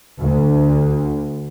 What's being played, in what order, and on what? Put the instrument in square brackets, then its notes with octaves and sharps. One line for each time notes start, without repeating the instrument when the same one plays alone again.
[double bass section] D2